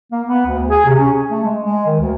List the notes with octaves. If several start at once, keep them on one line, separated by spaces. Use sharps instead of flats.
A#3
B3
D2
G#4
C3
C#4
G#4
A3
G#3
G#3
D#3
D2